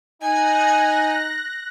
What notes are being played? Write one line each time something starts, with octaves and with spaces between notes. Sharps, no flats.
D#4 G#5 F#6 A#6